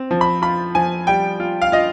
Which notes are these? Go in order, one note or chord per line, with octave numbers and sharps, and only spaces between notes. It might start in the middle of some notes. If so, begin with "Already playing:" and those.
Already playing: C4
F3
B5
F4 B5
F3 G#5
G3 G5
F4
F5
F4 D#5